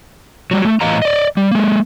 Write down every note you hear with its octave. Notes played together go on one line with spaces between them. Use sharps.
F#3 G3
A3
A2 E3 D#5 F5 A#5
D5 D#5
G3
G#3 A#3